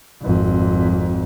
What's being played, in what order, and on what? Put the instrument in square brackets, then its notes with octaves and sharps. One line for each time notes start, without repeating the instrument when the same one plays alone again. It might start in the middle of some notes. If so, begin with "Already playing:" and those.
[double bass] G#1 F2